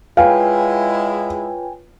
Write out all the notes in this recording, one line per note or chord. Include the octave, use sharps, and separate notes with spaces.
G#3 E4 F4 B4 C#5 F5 G5 G#5